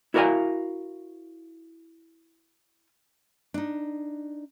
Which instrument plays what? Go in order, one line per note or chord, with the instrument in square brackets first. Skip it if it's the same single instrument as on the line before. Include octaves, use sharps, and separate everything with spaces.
[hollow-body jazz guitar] E4 F#4 A#4 D5 F5 G#5
[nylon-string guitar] D4 D#4